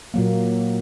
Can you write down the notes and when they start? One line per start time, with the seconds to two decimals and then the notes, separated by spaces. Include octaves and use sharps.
0.14 A#2 F#3 A#3